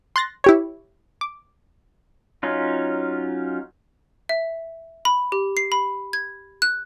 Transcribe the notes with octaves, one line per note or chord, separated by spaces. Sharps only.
C6 F#6 A6 A#6
E4 G4 C#5
D6
F#3 C#4 D#4 F4
E5
B5
G4
C7
B5
G#6
F#6